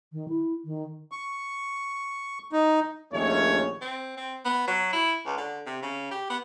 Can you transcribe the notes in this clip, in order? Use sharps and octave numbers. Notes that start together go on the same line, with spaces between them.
D#3
E4
D#3
C#6
D#4
A#1 D#2 A3 C#4 C#5
C4
C4
B3
F#3
E4
C#2
D3
C3
C#3
G4
B3